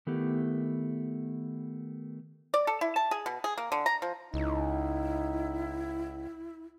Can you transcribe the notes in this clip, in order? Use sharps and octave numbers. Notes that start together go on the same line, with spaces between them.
D#3 A3 B3 E4 G4
D5
A4
E4
A5
G#4
B2
G#4
A#3
D3
A#5
F3
C#2 D#4 E4